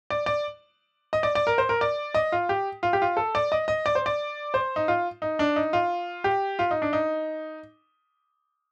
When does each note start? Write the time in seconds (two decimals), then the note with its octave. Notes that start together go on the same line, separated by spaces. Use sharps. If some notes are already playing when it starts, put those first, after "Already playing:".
0.10 D5
0.26 D5
1.13 D#5
1.23 D5
1.35 D5
1.47 A#4
1.58 C5
1.69 A#4
1.81 D5
2.14 D#5
2.32 F4
2.49 G4
2.83 F4
2.93 G4
3.02 F4
3.17 A4
3.35 D5
3.52 D#5
3.68 D#5
3.86 D5
3.95 C5
4.06 D5
4.54 C5
4.76 D#4
4.88 F4
5.22 D#4
5.39 D4
5.56 D#4
5.73 F4
6.24 G4
6.59 F4
6.71 D#4
6.82 D4
6.93 D#4